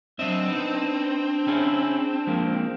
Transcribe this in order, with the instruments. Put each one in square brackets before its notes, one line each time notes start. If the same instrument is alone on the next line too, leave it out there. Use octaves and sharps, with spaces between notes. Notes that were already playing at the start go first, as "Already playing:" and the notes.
[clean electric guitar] F#3 D#5 E5 [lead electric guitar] C4 [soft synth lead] D4
[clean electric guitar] B3 D#4
C#4 E4 G#4
F3 G#3 A#3